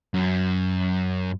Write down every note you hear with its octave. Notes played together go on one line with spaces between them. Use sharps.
F#2